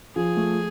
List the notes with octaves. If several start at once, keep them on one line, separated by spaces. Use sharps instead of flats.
F3 G#4
A3